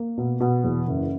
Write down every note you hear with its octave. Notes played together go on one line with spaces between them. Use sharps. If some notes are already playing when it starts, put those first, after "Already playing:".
Already playing: A#3
B2
B2
E2
F#1